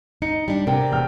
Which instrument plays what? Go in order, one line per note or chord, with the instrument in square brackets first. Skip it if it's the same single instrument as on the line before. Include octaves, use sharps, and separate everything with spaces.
[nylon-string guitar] D#4 [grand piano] C#7
[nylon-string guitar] G3 D4
[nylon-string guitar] C3 D4 [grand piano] A#4 G5
[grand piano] E1 G5 F6